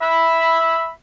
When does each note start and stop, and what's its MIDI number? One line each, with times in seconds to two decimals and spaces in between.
0.01 0.91 76
0.01 0.91 83